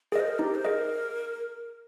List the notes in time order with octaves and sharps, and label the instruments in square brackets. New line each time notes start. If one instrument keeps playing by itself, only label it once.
[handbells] G#4 [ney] A#4
[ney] C5 [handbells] D#5
[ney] A#4
[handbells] D#4 [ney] G4
[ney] C5
[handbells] G#4 D#5 [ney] A#4